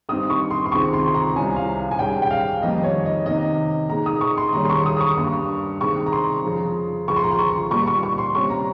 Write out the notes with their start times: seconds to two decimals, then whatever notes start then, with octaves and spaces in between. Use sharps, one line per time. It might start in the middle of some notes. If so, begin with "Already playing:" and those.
0.09 G2 G3 C4 D#4 D#6
0.30 C#6
0.50 C6
0.66 C6
0.72 C#2 C3 D#3 G#3 C4 C#6
0.93 C6
1.07 C6
1.14 A#5
1.36 C2 C3 G3 C#4 G#5
1.56 F5
1.91 G#5
1.99 G#2 G3 C#4 G5
2.22 G5
2.31 F5
2.62 F2 D#3 G3 A#3 D#4 D#5
2.84 C#5
3.06 D#5
3.26 C3 D#3 A#3 D#5
3.90 A#2 G#3 D#4 A#5
4.06 D#6
4.21 C#6
4.37 C6
4.53 D#2 C#3 G3 C#4 A#5
4.65 C6
4.70 C#6
4.86 D#6
4.97 D#6
5.00 C#6
5.17 G2 G3 A#3
5.81 C3 D#3 G#3 C#6
6.06 A#5
6.12 C6
6.45 F2 C#3 F3
7.08 C#2 C#3 F3 G#3 C#6
7.16 C6
7.23 A#5
7.31 C6
7.39 C#6
7.71 A#2 G3 A#3 C#6
7.87 C#6
8.03 C#6
8.18 C6
8.35 C3 G3 C#4 C#6
8.50 A#5